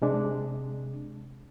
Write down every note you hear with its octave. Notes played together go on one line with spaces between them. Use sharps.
C3 G#3 D4